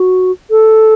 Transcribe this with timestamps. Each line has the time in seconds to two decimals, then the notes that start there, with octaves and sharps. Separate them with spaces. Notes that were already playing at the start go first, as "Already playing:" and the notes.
Already playing: F#4
0.51 A4